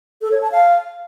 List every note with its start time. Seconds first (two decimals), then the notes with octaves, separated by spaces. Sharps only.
0.21 A4
0.32 C#5
0.42 A5
0.52 F5